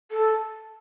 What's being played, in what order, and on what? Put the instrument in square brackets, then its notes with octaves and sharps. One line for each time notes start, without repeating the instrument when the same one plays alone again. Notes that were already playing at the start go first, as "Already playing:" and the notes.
[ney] A4